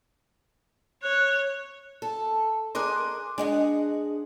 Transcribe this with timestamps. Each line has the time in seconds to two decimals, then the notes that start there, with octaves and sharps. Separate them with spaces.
1.03 C#5 F#6
2.02 A4
2.75 G#4 A#4 D#5 C6 D6 F#6
3.38 G#3 D4 G#4 D#5 F#5